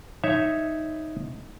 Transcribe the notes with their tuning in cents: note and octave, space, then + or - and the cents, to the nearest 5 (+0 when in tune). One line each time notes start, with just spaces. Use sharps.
D#4 +0 C#5 +0 E5 +0